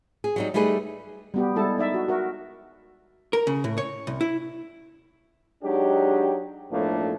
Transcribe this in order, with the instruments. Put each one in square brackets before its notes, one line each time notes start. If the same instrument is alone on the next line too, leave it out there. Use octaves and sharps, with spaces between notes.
[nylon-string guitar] G#4
F#3 G3 D#4
G3 A3 D#4 G#4 B4
[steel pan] G3 B3 G4
G3 G#3 E4 A4 A5
D#4 D5 E5
F#4
F#4 A#4 E5
[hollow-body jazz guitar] A#4
C#3
A2
C#5
C2
E4
[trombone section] F#3 G#3 D4 D#4 G4
B1 A2 F3 A3 A#3 D4